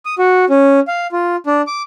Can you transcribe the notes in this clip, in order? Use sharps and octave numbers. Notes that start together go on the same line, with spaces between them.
D#6
F#4
C#4
F5
F4
D4
D6